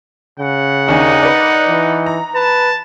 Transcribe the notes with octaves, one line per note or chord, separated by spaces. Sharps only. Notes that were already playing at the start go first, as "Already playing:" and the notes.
C#3 F#5
D#2 D4 D#4 G#5
B4 D5
E3
A#5
B4 A5